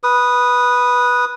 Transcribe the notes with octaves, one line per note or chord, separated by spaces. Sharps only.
B4 D#6